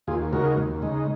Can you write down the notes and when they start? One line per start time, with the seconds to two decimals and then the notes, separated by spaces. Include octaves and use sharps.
0.07 D#2 F4 G#4
0.33 C#3 G#3 D#4 F#4 A#4
0.57 D#2
0.82 C#3 G#3 D#4